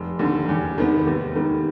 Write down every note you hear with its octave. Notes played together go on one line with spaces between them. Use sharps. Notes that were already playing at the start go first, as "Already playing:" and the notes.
Already playing: F1
D#2 D3
E2
C3 D#3 G3 B3
D#2
D#3 G3 B3